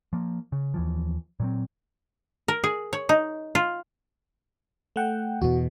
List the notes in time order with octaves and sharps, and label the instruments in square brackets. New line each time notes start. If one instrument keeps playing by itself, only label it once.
[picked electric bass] F3 A#3
C#3
D#2 E3 F3
A#2 F#3 C4
[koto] A#4
G#4
C#5
D#4
F4
[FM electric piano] A3 F#5 G5
[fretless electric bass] E2 B2 [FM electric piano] F#4